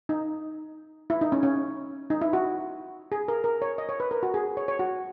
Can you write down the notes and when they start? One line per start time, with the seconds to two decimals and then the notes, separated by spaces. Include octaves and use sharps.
0.09 D#4
1.10 E4
1.21 D#4
1.32 C#4
1.43 C#4
2.10 D#4
2.21 E4
2.33 F#4
3.12 G#4
3.28 A#4
3.44 A#4
3.62 C#5
3.78 D#5
3.89 C#5
4.00 B4
4.11 A#4
4.23 F#4
4.34 G#4
4.57 C#5
4.68 C#5
4.79 F#4